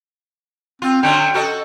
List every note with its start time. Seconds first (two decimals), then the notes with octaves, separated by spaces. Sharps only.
0.82 C4 F4
1.03 D3 F#3 C#4 G5
1.34 F#4 A4 D#5